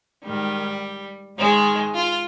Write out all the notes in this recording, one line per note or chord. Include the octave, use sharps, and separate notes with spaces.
G#2 D#3 G3
G#2 D#3 G#3
F4